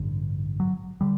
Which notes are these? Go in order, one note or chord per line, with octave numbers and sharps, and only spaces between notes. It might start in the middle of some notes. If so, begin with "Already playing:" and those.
Already playing: A1 G2 D3
F#3
D3 G3